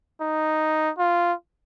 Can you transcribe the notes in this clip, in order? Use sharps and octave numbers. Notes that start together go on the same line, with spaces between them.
D#4
F4